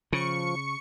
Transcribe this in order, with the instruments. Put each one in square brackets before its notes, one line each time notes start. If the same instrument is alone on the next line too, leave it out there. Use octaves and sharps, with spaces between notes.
[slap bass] C#3 [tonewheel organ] F3 [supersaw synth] C#6 C#7